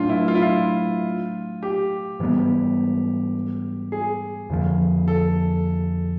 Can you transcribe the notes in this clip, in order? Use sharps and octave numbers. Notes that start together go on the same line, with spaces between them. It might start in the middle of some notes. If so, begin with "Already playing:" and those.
Already playing: A2 F#3 A3 D4 F4
E4
F4
E4
F4
G4
G#2 E3 G3 B3
G#4
F2 D3 F3
A4